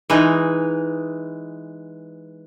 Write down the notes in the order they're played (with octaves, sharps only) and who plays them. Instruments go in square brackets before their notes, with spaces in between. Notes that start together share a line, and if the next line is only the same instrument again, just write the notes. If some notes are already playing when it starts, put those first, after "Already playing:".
[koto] E3 G#3 D#4